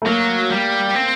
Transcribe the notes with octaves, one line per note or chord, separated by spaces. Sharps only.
A3
F#3 A#3
G3
C4